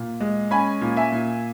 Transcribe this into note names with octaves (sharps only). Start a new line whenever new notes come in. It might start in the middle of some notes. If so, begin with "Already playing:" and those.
Already playing: A#2
G#3
C#4 G#5 B5
A#2
E5 G#5
A#2